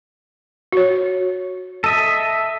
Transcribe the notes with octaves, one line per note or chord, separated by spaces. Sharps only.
F#4 C#5
A4 D#5 E5